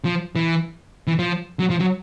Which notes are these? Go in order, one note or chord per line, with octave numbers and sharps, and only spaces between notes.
F3
E3
E3
F3
F#3
F3
F#3